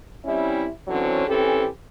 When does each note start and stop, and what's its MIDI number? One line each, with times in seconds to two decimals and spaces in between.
0.25 0.67 55
0.25 0.67 60
0.25 0.67 61
0.25 0.67 64
0.87 1.22 50
0.87 1.22 52
0.87 1.22 54
0.87 1.22 60
0.87 1.22 61
1.27 1.66 52
1.27 1.66 60
1.27 1.66 61
1.27 1.66 67
1.27 1.66 69